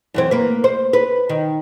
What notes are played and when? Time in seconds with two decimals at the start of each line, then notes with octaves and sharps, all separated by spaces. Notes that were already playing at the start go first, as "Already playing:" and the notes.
0.14 F#2 E3 C4
0.31 A#3 B4
0.64 C5
0.93 B4
1.29 D#3